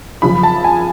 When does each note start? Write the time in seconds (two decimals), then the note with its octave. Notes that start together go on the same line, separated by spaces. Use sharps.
0.22 F#2 C#3 F3 B5
0.43 A5
0.64 G#5